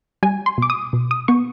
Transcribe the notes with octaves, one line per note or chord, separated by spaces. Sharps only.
G3 G#5
C6
B2 D6
D#6
B2
D#6
B3 C#6